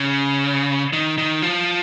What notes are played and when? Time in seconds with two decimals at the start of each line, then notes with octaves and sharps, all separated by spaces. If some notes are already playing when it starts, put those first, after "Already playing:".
Already playing: C#3
0.93 D#3
1.18 D#3
1.42 F3